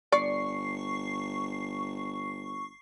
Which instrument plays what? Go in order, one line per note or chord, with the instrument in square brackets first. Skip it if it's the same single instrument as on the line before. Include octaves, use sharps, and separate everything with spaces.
[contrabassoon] G1 [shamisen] D5 [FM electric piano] C#6 C7